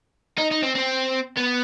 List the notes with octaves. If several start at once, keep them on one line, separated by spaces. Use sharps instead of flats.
D#4
D#4
C4
C4
B3